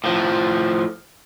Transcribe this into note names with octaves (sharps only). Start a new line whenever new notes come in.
A2 F3